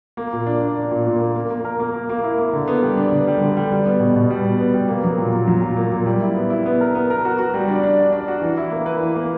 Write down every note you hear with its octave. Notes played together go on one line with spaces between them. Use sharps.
A#3
A#2
D4
D4
D4
A#2
A#2
A#3
A#3
A#3
A#4
A#3
A#3
A#3
E4
A#3
D3
B3
G3
D4
D3
G3
D3
G3
G3
B3
B2
B2
G3
B2
B3
G3
A#3
F#3
A#2
A#2
F#3
A#2
A#3
A#2
G3
E4
B3
E4
B3
A#4
B3
A#4
F#4
F#4
G3
D4
D4
D4
D4
F#4
E3
E4
A#3
B4
E3
A#3